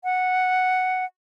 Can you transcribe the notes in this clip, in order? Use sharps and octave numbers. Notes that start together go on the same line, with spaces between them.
F#5